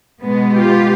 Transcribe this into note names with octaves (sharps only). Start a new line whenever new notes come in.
B2 G#3 B3
F4 G4